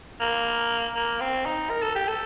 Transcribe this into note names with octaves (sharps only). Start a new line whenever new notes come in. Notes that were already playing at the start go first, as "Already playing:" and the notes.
A#3
A#3
C4
D#4
A#4
A4
G4
A4